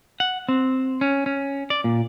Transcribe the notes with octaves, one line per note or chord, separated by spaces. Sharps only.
F#5
C4
C#4
C#4
D5
A#2